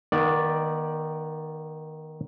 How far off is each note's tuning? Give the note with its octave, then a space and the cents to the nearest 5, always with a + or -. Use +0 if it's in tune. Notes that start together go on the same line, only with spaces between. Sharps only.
D#3 +0 B3 -30 D5 +0